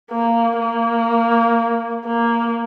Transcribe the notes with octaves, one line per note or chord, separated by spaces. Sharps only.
A#3
A#3
A#3